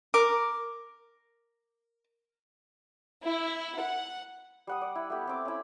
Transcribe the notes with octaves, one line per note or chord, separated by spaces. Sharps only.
A#4 D6
E4
F#5
G3 F#5 D#6
D5
E4
A3 B3 G4
A3 C4 D6
C#4 E4